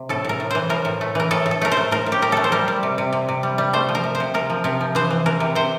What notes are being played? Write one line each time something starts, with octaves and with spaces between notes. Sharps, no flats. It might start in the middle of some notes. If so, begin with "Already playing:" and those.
Already playing: C3
A2 A4
A2 A#4
A2
E3 C5
A2 A#4
A2
A3
E3 A#4
A2 A4
A2
A4
A3 A#4
C5
A3
A2 A#4
A2
G4
A2 A#4
A3 A4
C5
G3 A#4
G3
C3
C3
C3
C3
G3
G3
A3 C5
F3
A#4
C3
C5
C3
C3 A#4
F3
C3 A#4
F3
E3 C5
E3
E3 A#4
C3
C3 C5